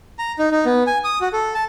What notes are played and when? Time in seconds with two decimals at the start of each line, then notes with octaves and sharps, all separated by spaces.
0.19 A#5
0.39 D#4
0.52 D#4
0.65 B3
0.87 G#5
1.04 D#6
1.21 F#4
1.33 A4
1.54 A5